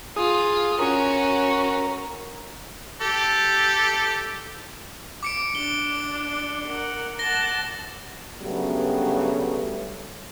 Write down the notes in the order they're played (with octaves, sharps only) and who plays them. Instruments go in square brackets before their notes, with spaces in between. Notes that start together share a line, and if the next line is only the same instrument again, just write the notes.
[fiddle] F4 [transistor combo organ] G#4 D#6
[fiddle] C#4 F#4 [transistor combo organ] A#4
[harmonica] G4 A4
[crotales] D6 C#7 D7
[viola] D4 [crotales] G7
[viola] A#4 F#5
[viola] F#5 A5 [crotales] A#6 G7
[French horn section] G2 C#3 F#3 G3 A3 B3